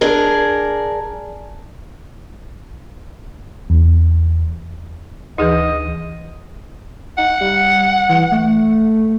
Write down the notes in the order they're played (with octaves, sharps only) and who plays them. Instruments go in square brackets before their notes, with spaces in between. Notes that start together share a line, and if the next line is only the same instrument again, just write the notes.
[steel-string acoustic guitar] D4 G#4 A#4
[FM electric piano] E2
[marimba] D2 E3 [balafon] D#4 G#4 B4 [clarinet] D#5
[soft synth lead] D#4 [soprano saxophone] F#5
[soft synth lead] G3
E3
A3